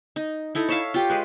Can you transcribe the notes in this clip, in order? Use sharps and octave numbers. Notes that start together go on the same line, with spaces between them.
D#4
D#4 E4 A4
C#5 E5 F5
F4 G4
G#3 B4